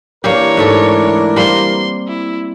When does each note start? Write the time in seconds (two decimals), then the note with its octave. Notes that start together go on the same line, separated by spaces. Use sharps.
0.24 E3 A#3 D4 G4 A#4 C#5
0.57 G#2 A3 A4
1.36 G3 A#3 C4 C6
2.08 E4